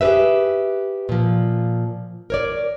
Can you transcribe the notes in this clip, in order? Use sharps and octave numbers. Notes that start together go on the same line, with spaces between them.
G4 G#4 A#4 B4 E5
A#2 F3
A#4 C#5 D5